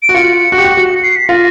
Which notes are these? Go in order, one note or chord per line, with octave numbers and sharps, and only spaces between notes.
D7
F#4
F4 C#7
F#4
G4
F#4
F#4
C7
B6
F4 A#6